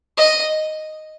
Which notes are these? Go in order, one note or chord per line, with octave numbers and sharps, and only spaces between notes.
D#5